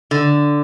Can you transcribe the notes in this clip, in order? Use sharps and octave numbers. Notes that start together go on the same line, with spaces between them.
D3